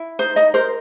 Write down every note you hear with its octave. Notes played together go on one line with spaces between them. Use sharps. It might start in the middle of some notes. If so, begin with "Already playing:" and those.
Already playing: E4
D#4 C5
D#4 D#5
A#4 C5